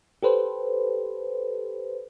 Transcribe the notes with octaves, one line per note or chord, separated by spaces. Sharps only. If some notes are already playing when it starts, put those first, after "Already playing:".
G4 A4 B4 C5